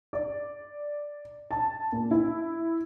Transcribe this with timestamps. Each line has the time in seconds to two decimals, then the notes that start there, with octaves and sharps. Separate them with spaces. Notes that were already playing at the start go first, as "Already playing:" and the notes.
0.13 D5
1.51 A5
1.92 A#2
2.11 E4